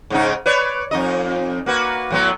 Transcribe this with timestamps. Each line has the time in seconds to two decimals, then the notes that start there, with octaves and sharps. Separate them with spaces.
0.10 G#2 C#3 D#4
0.46 B4 C#5 D5
0.91 F2 D#4 D#5
1.66 A#3 F#4 B4
2.11 A2 F#3 B3